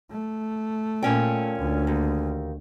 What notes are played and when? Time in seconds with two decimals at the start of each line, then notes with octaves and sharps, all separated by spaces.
0.11 A3
1.03 A#2 C#4 G5
1.59 D2
1.87 D#2